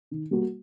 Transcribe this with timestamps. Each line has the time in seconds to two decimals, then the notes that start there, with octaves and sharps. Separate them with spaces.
0.11 D#3
0.31 G3 A#3 F#4